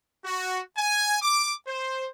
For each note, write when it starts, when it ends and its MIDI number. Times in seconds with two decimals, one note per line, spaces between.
0.25 0.59 66
0.77 1.17 80
1.22 1.52 86
1.68 2.07 72